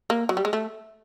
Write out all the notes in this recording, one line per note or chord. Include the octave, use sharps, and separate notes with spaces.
A#3
F#3
G3
G#3
A3